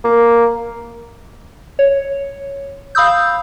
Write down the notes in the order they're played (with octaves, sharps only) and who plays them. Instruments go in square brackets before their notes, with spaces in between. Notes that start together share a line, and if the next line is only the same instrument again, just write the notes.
[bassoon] A#3
[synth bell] C#5
F5 B5 D#6 E6 G6